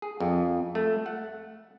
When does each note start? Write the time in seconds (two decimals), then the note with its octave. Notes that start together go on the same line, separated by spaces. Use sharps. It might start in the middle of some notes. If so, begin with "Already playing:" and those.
0.02 G#4
0.20 F2
0.75 A3
1.06 F#5